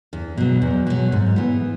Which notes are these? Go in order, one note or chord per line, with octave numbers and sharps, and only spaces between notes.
E2
B2 F#3
E2
B2 F#3
G#2
E3 B3